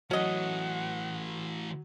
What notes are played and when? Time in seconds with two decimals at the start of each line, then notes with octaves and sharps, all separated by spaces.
0.11 E3 F#3 A3 C#4 D#5 F#5